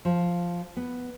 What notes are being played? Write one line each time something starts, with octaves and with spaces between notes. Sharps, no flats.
F3
B3